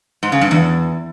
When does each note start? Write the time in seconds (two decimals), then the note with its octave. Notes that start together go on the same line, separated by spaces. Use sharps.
0.23 G#2
0.32 C#3
0.41 G2
0.51 E2